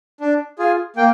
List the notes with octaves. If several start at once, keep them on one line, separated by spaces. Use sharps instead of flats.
D4
F4 G#4
A#3 G5